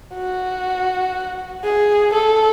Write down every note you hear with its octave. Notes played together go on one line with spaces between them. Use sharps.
F#4
G#4
A4